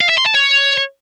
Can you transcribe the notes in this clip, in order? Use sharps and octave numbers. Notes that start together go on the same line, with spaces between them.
F5
E5
C6
A5
C#5